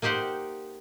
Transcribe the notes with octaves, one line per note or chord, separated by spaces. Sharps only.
A#3 D#4 G4 C5 F#5